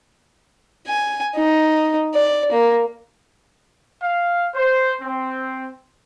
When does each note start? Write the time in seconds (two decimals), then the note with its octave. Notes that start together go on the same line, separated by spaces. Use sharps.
0.87 G#5
1.35 D#4
2.14 D5
2.51 A#3
4.02 F5
4.54 C5
5.02 C4